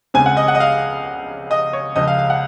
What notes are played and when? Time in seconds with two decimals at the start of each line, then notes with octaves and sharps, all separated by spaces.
0.14 C#2 C#3 G#3 C4 G#5
0.26 F#5
0.37 D#5
0.48 F#5
0.55 D#5
0.60 F5
1.51 D#5
1.73 C#5
1.96 C#2 C#3 F3 D#5
2.07 F5
2.19 F5
2.30 F#5